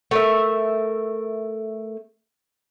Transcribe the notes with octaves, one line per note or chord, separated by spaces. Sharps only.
A3 A#4 E5